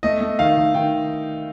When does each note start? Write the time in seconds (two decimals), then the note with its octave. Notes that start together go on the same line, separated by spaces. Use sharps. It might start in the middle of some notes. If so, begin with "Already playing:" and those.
0.03 A3 D#5
0.21 A3
0.39 D#3 F5
0.57 D#3
0.74 D#3 G5